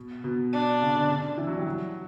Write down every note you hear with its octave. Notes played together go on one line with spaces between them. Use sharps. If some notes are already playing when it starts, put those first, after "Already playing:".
Already playing: B2
B2
D4
C#3
D3
D3
E3
F#3
G3
F#3